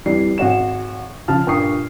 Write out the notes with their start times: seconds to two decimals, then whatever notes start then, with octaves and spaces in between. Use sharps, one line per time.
0.06 F2 E3 G3 D5 C7
0.38 G#1 F#4 C#5 E7
1.28 C#3 F3 F4 A5 F6
1.47 G2 A#2 G5 C#6 D#6 C7